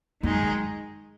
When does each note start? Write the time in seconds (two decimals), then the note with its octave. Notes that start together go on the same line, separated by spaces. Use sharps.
0.23 F#2 D#3 G#3 D#4 G#4
0.43 F#2